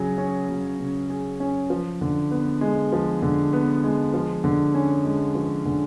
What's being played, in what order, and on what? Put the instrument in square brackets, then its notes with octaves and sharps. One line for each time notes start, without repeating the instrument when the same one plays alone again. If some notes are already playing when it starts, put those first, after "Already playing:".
Already playing: [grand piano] C#3 F#3 G#4
C#4
F#3
C#3
G#4
C#4
F3
D3
B3
G#3
F3
D3
B3
G#3
F3
D3
C#4
G#3
F3
D3